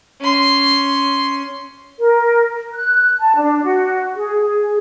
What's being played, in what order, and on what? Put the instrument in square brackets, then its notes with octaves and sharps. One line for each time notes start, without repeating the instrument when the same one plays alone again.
[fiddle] C#4 C6
[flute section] A#4
F#6
A5
D4
F#4
G#4
G#4